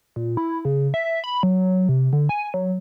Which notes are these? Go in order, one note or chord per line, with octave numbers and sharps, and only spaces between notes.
A#2
E4
C#3
E5
B5
F#3
C3
D3
G#5
F#3